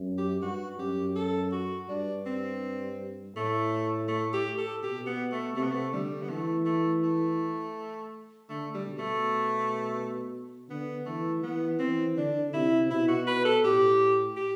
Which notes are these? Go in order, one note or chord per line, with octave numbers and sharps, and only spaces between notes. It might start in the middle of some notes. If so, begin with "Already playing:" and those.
Already playing: F#2
G4
G2 F#4
F#2 G4
A4
F#4
G2 D4
C4
A2 A3
A3
G4
A4
B2 G4
B3
A3
C3 A3
B3
A3
D3 G3
B3
E3 A3
A3
A3
D3 A3
G3
B2
A3
D3 B3
E3 A3
E3 B3
E3 C4
D3 D4
C3 E4
B2 E4
F#4
B4
A4
A2 G4
G4